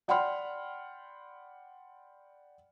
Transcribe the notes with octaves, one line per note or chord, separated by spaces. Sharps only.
D5 F#5 G5 B5 C6 F6